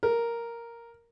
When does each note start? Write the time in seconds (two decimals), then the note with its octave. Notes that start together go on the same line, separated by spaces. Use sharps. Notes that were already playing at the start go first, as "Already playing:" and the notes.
0.03 A#4